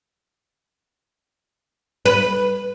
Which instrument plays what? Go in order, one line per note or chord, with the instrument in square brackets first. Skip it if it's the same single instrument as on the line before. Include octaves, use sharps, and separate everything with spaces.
[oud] B4